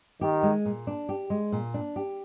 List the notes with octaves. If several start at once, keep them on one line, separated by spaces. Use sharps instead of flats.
D#3 G4
G#3
A#2
D4
G4
G#3
A#2
D4
G4